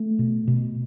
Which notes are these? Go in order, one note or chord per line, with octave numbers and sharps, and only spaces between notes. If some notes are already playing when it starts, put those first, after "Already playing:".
Already playing: A3
B2
B2